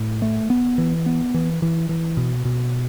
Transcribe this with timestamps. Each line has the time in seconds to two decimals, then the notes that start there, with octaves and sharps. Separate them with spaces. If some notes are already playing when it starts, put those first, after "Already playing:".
Already playing: A2
0.22 A3
0.50 B3
0.78 E3
1.06 B3
1.34 E3
1.62 E3
1.89 E3
2.17 B2
2.45 B2